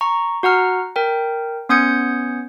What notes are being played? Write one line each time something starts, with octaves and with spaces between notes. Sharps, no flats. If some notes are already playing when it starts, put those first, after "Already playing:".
A#5 C#6
F#4 F#5 A#5 F6
A#4 G5
B3 C#4 D#6 G6 G#6 C#7